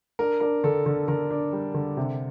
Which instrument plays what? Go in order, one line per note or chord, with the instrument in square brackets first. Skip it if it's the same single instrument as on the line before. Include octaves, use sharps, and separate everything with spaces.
[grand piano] D4 [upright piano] A#4
[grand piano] D4 [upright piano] A#4
[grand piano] D3 [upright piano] A4
[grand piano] D3 [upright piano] A#4
[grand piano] D3 [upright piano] A#4
[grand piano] D4
G3
D3
C3